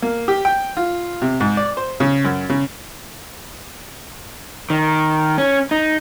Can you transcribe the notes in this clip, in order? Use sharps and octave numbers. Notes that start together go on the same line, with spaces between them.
A#3
G4
G5
F4
C3
G#2
D5
C5
C#3
F#2
C#3
D#3
C#4
D#4